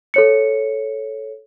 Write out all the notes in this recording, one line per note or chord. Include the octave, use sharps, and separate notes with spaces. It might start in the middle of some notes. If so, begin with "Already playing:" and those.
A4 C#5 C#7